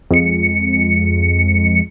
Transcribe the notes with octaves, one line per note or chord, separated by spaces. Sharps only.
F2 G#3 C#7